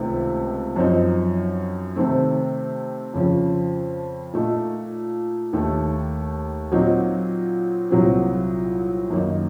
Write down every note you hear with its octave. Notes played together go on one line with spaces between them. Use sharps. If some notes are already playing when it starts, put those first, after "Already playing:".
Already playing: C#2 C3 D#3 A3
F#2 F3 C4 D#4
C3 D#3 A3 C4
F2 C#3 F3
A#2 A3 D#4
D#2 D#3 A3
A#2 F#3 C4 D#4
C2 A#2 F#3 C4
F#2 D#3 A#3 D#4